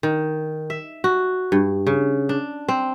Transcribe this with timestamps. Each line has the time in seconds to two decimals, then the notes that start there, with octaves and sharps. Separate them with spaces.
0.03 D#3
0.70 E5
1.04 F#4
1.52 G2
1.87 C#3
2.29 D4
2.68 C4